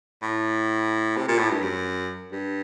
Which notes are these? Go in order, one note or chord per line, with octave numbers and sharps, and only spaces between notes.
A2
C3
A#2
A2
G2
F#2
G2